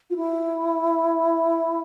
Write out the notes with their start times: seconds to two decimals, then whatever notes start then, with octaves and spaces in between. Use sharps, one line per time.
0.10 F4
0.16 E4